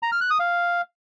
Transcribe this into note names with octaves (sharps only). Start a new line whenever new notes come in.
A#5
F6
F#6
D#6
F5